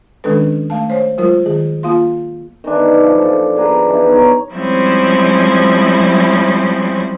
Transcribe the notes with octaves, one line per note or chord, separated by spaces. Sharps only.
D#3 G#3 C#4 D4 A4 B4
A3 F5 A5
C5 C#5
F#3 G#3 F4 A#4 C5
D#3 G#4
A#3 F4 F5 C6
D#3 E3 D4
E3 F3
A#2 A4
D4 G#4 B4 A#5
E3 B3 D#4
D#4 C#5 A#5
F3 G3 G#3 C4 C#4 E4